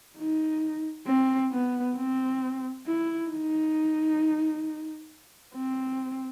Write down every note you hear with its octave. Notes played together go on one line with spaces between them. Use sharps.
D#4
C4
B3
C4
E4
D#4
C4